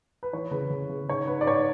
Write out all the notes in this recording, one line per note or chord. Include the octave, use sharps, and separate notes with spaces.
B4
E3 C#5
C#3 B4
C#3
C#3
G#2 C#5
G#2 B4
D5
G#2 C#5